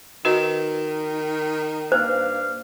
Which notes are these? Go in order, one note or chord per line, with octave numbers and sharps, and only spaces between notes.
D#3 F#4 B4 D#5
G2 A#3 C5 F5